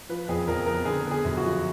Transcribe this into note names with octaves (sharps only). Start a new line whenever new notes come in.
F3 B4
F2 G#4
F2 A#4
B3 A#4
D3 G#4
B3
G#4
F#2
F#4
F3